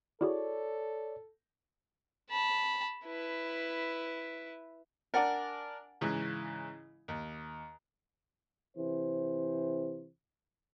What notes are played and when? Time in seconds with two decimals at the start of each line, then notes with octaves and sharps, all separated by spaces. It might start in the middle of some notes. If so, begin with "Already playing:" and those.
0.21 E4 F#4 G#4 A4 C#5 D5
2.30 A5 B5
3.06 E4 B4
5.14 D4 A#4 D5 F#5 G#5
6.01 G#2 C#3 E3
7.08 D#2
8.77 C3 E3 C5